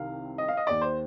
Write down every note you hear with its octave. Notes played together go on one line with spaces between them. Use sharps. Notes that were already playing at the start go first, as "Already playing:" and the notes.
Already playing: C2 C3 D#3 F5
D#5
F5
D#5
D#2 D#3 D5
C5